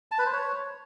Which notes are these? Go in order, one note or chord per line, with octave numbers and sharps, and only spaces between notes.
A5
B4
C5
C#5